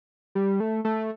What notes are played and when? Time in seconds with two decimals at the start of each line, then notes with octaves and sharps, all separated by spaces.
0.35 G3
0.60 A3
0.85 A3